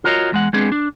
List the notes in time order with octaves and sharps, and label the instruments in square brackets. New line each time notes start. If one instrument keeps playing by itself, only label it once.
[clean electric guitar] F4 F#4 A#4 C#5 D#5
E2 G#3 F#5
G#3 B3 C4 D4 G#4
D4